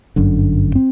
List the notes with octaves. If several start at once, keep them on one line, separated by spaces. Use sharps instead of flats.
G1 F#2 D3
C4